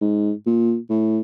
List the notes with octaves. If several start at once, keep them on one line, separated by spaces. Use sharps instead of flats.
G#2
A#2
A2